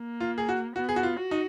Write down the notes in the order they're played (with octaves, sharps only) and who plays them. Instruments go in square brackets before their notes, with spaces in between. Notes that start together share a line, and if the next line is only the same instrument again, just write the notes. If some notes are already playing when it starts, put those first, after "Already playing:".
Already playing: [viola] A#3
[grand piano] F4
G#4
F#4
[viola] B3 [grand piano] F#4
[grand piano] G#4
F#4
F4
[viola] F#4
[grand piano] D#4